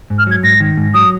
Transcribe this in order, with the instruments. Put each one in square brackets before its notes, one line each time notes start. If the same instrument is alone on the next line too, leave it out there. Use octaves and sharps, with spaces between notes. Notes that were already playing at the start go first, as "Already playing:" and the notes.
[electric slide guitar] G#2
[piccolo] F6
[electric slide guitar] F#3 [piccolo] G#6
[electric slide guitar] G#2 [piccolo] A#6
[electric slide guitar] D#3
G#2
[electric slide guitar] F#3 [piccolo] D#6